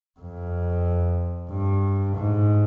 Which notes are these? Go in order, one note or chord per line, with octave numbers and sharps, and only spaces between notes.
F2
G2
G#2